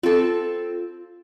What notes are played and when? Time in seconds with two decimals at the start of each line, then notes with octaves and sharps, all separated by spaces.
0.03 C4 F4 A4